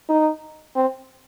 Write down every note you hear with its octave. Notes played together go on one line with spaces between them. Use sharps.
D#4
C4